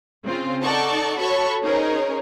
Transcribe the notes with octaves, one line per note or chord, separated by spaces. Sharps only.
C#3 C4 F4
D#4 A4 D5 F#5 A5 C#6
F#4 A4 C#5 B5 C#6
C#4 D#4 G#4 A#4 C5 C#5